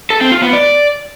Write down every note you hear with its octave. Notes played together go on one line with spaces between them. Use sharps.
A4
C4
F4
B3
D5